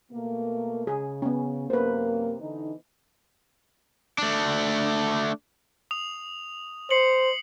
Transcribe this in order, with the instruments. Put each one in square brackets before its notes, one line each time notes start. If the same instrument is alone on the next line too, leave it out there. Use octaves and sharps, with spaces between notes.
[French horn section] B2 A3 A#3
[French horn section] C#3 [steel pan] G#4
[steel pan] B3 C#4
[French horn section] F#2 C3 A#3 [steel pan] B4 C5
[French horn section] D3 E3 D#4
[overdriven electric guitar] A3 D4
[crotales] D#6 F7
[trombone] C5 [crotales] C7 C#7 F#7